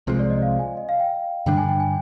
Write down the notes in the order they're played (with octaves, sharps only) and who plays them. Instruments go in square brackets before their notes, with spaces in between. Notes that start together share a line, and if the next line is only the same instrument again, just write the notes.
[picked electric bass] C2 C3 F3 G#3 [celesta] C5
[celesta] D5
D#5
F5
G#5
D#5
F5
G5
[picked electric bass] G2 D3 G3 D4 [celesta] G5
[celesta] G#5
G5
G#5